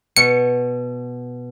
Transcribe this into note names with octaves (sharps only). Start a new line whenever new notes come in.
B2 C#7